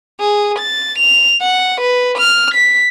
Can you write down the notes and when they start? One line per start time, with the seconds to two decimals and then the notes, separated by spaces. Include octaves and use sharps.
0.20 G#4
0.58 A6
0.98 F7
1.41 F#5
1.81 B4
2.18 F6
2.54 B6